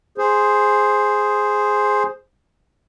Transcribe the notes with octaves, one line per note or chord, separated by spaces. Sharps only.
G#4 C5